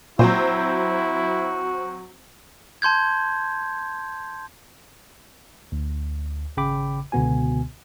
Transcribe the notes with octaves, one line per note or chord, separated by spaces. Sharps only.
A#2 F#3 C4 E4 F#4 C5
A5 C6 G6 G#6
D2
G#1 C#3 G5 B5 D6
C#2 B2 D3 B3 F#4 G#5